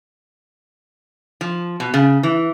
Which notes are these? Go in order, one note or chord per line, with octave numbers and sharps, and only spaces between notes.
F3
B2
C#3
E3